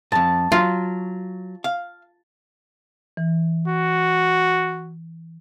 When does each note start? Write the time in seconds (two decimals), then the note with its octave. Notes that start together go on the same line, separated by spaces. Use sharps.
0.12 F2 G#2 A5
0.52 F#3 F4
1.64 F5
3.17 E3
3.68 F#4